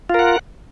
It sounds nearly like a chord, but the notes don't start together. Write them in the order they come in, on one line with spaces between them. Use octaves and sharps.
F4 A#4 F#5